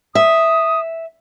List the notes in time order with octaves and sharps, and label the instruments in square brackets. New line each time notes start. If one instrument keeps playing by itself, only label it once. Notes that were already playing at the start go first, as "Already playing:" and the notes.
[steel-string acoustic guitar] E5 [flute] D#6